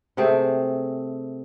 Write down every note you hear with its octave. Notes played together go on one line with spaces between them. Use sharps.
C3 A3 C4 G#4